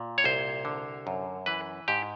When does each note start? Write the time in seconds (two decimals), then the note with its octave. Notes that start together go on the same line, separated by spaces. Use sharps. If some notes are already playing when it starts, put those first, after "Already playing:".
Already playing: A#2
0.18 C#5
0.24 C2 C5
0.65 D3
1.07 F#2
1.46 E3 B4
1.88 G#2 G4